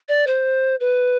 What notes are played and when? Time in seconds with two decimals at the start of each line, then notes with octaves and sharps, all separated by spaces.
0.08 D5
0.26 C5
0.80 B4